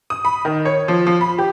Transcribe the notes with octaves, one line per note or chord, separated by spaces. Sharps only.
D#6
B5
D#3
C#5
F3
F3
B5
G4